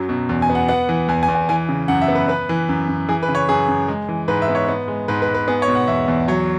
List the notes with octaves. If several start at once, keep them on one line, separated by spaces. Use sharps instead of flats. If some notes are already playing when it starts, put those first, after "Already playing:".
Already playing: F#2 F#3
B2
E2
G#5
B3
F#5
B3 F#5
E3
E2 G#5
G#5
E2
G#5
E3 G#5
C#3
F#2 F#5
E5
B3
B4
B3 B4
E3
F#2
F#2
E3 G#4
B4
C#3
C#5
F#2 G#4
F#2
G#3
E3
G#2 B4
E5
B3
C#5
B3
G#3
G#2 B4
B4
G#2
B4
B3 G#4
C#5
B2
F#5
E2 E5
E2
F#3 C#5